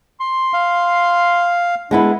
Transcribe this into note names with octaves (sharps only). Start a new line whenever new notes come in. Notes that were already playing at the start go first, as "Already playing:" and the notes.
C6
F5
G#3 B3 D4 E4